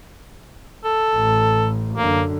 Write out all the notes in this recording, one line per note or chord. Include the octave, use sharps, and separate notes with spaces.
A4
A1
F#2 D3 A#3